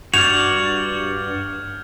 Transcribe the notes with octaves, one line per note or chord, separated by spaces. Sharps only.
G2 F#4 D5 F6 G6 G#6 F7